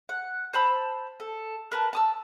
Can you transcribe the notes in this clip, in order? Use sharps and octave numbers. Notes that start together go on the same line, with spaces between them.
F#5
C5 A5 B5 E6
A4
A#4 B4 A5
A5 D#6 E6